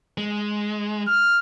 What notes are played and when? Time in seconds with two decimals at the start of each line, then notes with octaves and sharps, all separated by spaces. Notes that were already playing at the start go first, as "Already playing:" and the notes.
0.18 G#3
1.08 F6